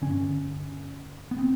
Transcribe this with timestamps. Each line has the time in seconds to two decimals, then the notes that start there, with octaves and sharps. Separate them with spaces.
0.02 G2 D3 C#4
1.31 B3
1.38 C4